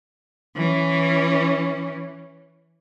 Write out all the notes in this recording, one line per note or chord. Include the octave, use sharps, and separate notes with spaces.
E3 C#4